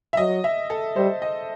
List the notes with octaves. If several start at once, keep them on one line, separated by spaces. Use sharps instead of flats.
E5
F#3 D#5
E5
A4
G3 C5
D#5